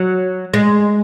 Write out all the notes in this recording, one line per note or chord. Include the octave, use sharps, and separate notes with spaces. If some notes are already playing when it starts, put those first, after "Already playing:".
Already playing: F#3
G#3